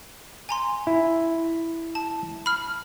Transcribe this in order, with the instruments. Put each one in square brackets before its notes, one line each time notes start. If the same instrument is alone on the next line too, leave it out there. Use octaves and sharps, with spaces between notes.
[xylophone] G#5 A#5 C6
[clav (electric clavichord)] E4
[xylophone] A5
B5 F6